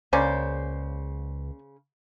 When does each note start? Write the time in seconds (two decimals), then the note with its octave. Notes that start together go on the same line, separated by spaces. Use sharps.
0.13 C#2 C#3 A#3 C#4 C5 D5